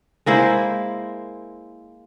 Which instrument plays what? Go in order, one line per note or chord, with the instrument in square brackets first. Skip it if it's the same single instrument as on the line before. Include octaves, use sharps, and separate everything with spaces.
[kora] G#3 A#3 E4 C5